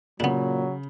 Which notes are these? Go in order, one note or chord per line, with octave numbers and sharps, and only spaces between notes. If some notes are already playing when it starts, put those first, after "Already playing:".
A#2 C#3 F#3 B3 D4